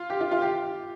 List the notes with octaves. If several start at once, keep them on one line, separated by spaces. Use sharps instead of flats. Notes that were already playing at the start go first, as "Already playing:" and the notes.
Already playing: F4
G4
F4
F4
G4